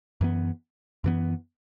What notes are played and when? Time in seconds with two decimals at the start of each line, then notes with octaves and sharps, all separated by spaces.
0.21 F#2 E3 B3
1.04 F#2 E3 B3